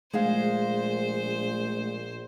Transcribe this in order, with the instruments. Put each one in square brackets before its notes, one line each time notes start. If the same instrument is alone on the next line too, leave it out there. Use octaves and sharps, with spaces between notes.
[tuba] A#1 [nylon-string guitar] G#3 G#4 F5 [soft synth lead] A3 [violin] C5